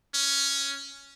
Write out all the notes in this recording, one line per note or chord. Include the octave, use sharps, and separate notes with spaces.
C#4